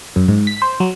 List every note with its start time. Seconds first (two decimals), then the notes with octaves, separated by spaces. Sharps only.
0.16 F#2
0.28 G#2
0.47 B6
0.62 C5
0.80 F#3